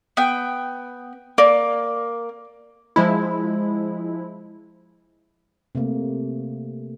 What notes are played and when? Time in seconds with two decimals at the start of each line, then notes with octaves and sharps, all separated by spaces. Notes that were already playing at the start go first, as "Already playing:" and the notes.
0.17 B3 G5
1.38 A#3 D5
2.96 F3 G#3 E4
5.75 C3 A3 A#3